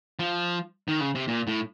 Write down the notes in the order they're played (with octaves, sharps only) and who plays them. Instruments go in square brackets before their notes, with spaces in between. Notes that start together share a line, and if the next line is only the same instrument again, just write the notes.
[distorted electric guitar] F3
D#3
C#3
C3
A#2
A2